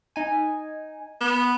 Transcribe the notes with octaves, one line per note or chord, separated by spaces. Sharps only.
D#4 G#5
B3